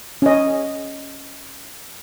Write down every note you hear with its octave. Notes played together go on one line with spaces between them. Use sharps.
C#4 D#5